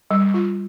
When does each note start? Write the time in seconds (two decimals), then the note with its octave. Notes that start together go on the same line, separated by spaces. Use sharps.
0.11 G3
0.34 F4